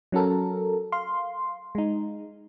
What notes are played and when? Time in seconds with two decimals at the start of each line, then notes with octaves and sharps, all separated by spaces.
0.12 F#3 C#4 F#4 A4 A#4
0.92 F5 C6
1.75 G#3 D#4